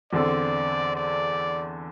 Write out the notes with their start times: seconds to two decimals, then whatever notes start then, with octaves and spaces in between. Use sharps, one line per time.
0.12 E2 D3 C4 A4 D5
0.95 D5